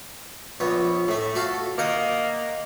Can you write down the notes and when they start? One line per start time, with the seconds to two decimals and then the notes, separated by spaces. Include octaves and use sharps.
0.60 A#1 B3 C#5
1.08 A2 A3 E5
1.35 F#4 A4 F5
1.78 D#3 A#3 F#5 D#6